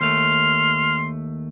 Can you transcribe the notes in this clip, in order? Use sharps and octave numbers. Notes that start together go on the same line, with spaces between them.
D#2 A3 C6 F6